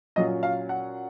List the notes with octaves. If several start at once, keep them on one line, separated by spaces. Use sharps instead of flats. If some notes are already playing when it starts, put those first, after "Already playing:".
A#2 F#3 C#4 F4 D#5
F5
F#5